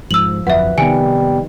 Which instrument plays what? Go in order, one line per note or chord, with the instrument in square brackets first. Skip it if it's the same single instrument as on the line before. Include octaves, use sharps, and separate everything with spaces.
[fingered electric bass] G#2 [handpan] F3 [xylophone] E6 F#7
[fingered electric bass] G1 F2 F#3 [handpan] B4 [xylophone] E5 F#5
[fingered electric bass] C3 B3 [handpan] D#3 [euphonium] G3 [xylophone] G#5 D7